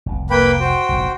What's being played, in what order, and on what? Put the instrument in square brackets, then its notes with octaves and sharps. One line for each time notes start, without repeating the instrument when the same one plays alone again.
[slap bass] F1 C2
[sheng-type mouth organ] A#3 B4 B5 [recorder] G5
[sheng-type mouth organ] F#4 C5
[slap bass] F1 A#1 G#2